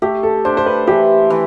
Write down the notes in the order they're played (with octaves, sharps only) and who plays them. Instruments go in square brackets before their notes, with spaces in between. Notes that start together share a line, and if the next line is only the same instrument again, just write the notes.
[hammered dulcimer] A3 [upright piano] G4
[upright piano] A4
[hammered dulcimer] D4 [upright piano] C5
[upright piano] C5
B4
[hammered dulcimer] E3 [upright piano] G4
[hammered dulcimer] E3